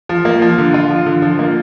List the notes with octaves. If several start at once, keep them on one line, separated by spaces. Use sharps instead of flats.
F3
A#3
F3
D3
F4
F3
D3
F3
A#3